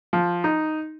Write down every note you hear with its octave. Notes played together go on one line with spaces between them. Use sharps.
F3
D#4